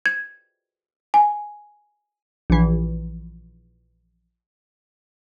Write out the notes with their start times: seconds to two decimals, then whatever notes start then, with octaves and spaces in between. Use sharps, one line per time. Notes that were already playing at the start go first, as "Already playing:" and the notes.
0.06 G#6
1.14 G#5
2.50 A#1 E3